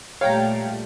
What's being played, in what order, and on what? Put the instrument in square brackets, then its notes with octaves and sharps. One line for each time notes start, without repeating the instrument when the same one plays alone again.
[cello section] A#2 G3 A3 [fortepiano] C#5 [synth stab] F5 G5 A#5